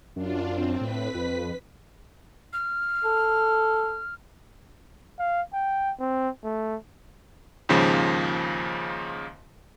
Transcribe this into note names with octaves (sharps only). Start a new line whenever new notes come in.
F#2 D4 F4
C4
A2 B4 B6
F2
F6
A4
F5
G5
C4
A3
D#2 G#2 C#3 F3